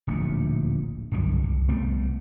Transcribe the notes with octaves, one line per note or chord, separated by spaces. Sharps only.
D1 A#1 D#2 A3
G1 C2 F#2 D#3
C2
C2 A3 B3 C4